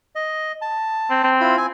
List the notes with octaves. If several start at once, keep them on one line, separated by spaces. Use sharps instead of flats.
D#5
A5
C4
C4
E4 F4 B5
C4 G#5